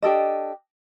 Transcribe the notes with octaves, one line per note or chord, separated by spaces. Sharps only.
D4 G4 A4 D#5